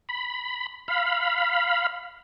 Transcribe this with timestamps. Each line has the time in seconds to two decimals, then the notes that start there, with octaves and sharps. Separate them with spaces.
0.09 B5
0.88 F5 B5